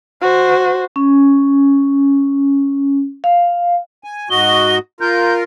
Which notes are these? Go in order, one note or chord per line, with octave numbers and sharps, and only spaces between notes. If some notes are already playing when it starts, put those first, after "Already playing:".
F#4 C5
C#4
F5
G#5
G#2 F#4 D#5 G7
F4 A#4 G6